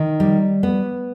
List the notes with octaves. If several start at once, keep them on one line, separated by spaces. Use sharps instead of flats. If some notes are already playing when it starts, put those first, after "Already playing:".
Already playing: D#3
G3
B3